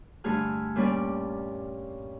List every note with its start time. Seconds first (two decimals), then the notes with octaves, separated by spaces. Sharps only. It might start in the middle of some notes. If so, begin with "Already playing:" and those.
0.24 G2 D3 A3 G#4 G#5 F6
0.76 A#2 G3 C#4 D5